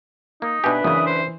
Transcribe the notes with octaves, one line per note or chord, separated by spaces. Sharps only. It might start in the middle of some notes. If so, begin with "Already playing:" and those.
A#3 D#4
B2 D4 G4 B4 E5 G#5
F#2 C#3 E3 D#6
C5